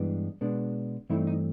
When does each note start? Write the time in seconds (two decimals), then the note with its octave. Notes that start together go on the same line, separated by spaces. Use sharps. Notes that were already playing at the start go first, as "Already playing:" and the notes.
Already playing: G2 E3 G#3 B3 D4
0.41 B2 G#3 B3 D4
1.10 G2 E3 A3 C4 D#4 E4
1.27 D#4